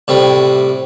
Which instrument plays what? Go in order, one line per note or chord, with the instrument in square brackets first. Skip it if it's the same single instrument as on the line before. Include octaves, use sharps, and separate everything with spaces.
[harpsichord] A2 C3 G3